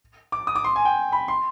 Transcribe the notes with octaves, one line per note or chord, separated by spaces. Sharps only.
D6
D#6
D6
C6
G#5
G5
B5
C6